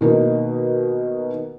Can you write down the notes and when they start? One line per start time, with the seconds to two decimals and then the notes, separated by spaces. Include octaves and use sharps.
0.01 B2 D#3 A#3 D#4